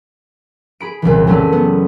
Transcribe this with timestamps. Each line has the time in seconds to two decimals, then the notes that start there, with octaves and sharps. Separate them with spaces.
0.80 G#4 B5 D7
1.02 F#1 C2 A#2 E3
1.27 F#3 A3 C#4 D5
1.52 B3